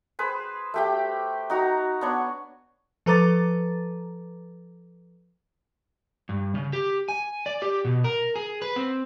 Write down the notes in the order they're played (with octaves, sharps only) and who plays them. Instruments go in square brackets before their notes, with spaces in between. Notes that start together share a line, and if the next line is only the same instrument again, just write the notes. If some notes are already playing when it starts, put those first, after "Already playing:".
[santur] G#4 B4 C5
A3 G4 G5
D#4 F#4 A#5
B3 D4 C#5
[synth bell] F3 A4 B4 A#5 D6 A6
[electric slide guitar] G2
C#3
G4
G#5
D5
G4
B2
A#4
G#4
B4
C4